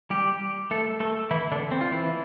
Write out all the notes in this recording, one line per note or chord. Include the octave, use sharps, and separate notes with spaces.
G3 G4
A3 A4
A3 A4
E3 E4
D3 D4
C4
F4
E3 E4